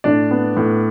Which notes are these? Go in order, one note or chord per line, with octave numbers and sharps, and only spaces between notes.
A2 D4 D5
B3
A2